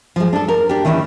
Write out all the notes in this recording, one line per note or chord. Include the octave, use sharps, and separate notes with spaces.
F3 G#3
D4 A4
A#4
D4 G4
D#3 E3 C#4 D5 E5